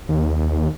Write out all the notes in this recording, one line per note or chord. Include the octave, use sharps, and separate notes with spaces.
D#2